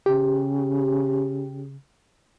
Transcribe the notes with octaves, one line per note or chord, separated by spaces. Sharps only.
C#3 G4